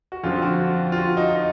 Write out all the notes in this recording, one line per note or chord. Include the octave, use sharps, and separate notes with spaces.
F#4
F2 D3 F3 F4
F#4
F4
F#4
D#4
D#4